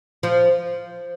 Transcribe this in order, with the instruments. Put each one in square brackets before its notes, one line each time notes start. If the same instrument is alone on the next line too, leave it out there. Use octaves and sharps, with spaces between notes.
[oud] F3